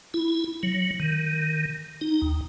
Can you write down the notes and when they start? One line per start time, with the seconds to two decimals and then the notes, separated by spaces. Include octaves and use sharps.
0.14 E4
0.63 F#3
1.00 D#3
2.01 D#4
2.22 D#2